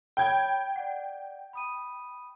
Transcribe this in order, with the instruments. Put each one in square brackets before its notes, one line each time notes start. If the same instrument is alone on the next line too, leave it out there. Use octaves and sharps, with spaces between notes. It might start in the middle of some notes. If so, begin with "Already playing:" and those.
[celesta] C#5 B5 G6 [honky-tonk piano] G5 G#6
[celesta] D5 F#5
B5 D#6 D#7